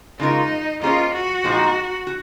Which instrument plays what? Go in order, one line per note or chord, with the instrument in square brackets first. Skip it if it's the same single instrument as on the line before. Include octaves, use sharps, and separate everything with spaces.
[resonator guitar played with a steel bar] C#3 G#3 C4 F4 A#4 [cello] D#4
[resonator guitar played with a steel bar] A#3 C#4 G#4 C5 D#5 [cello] F4
[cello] F#4
[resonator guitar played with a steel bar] A#2 F3 G#3 C4 D#4
F#4